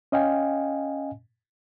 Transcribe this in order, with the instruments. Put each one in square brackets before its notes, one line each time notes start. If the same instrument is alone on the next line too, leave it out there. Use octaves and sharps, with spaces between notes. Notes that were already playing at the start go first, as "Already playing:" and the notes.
[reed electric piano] C#4 D#5 F5 G5 G#5